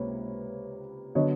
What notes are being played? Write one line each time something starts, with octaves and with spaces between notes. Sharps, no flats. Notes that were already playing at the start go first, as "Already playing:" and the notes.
Already playing: C#2 C3 A#3 B4 C#5
D3 F#3 B3 C#5 D#5